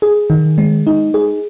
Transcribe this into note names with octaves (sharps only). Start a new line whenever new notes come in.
G#4
D#3
G#3
D#4
G#4